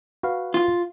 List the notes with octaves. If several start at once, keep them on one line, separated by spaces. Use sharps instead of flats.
F#4 B4 F5
F4